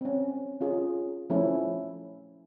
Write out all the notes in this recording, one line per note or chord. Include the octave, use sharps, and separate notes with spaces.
C4 C#4
C#4 F4 G#4
F3 A3 C#4 E4